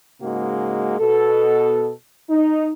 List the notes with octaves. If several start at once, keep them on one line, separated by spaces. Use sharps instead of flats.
G#2 C#3 G#3 A#3 F#4
B2 A4
D#4